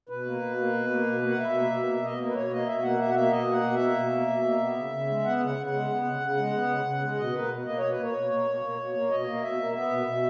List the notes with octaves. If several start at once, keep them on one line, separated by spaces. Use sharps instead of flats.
B2 B4
A#3
B2
A#3
B2
A#3
B2
A#3
F#5
B2 E5
A#3
B2
A#3
B2 D#5
A#3
B4
B2 C#5
A#3 D#5
B2 E5
A#3 F#5
B2 E5
F#5
A#3 E5
B2 D#5
A#3 F#5
B2
A#3 E5
B2
A#3
B2
A#3
B3
C#3
C#3
G#3
B3 F#5
C#3 F#5
C#3
F#5
G#3
B3
C#3
C#3
G#3
B3
C#3
C#3
G#3
B2 D#5
A#3 B4
B2
A#3 D#5
B2 C#5
B4
A#3 C#5
B2
A#3
B2
A#3
B2
A#3
B2 D#5
A#3
B2 E5
A#3
B3 E5
B2
B2